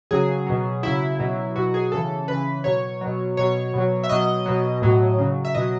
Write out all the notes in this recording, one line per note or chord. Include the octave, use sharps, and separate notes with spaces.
C#3 F#3 G#4
B2 F#3
C#3 F#3 E4
B2 F#3
B2 F#3 F#4
G#4
C#3 E3 A4
C#3 E3 B4
B2 F#3 C#5
B2 F#3
B2 F#3 C#5
B2 F#3
E5
B2 F#3 D#5
B2 F#3
A2 F#3
C#3 F#3
E5
B2 F#3 D#5